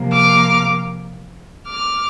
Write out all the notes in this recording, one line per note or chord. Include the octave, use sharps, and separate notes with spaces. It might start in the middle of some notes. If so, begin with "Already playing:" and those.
Already playing: C3 F3 A#3
D6 F6
D6 F6